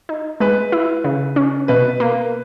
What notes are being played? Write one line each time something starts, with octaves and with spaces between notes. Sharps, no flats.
D#4
G#3 B4
E4
C#3
C#4
B2 B4
A#3